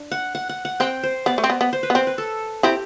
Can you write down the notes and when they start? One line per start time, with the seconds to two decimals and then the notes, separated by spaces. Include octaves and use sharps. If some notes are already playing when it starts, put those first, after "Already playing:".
Already playing: D4
0.12 F#5
0.35 F#5
0.49 F#5
0.65 F#5
0.80 C4 G5
1.03 C5
1.26 B3 D5
1.38 A3
1.44 C4
1.50 B3
1.61 B3
1.73 C5
1.83 B4
1.90 B3
1.95 C4 C5
2.07 B4
2.18 A4
2.63 C4 E4 G4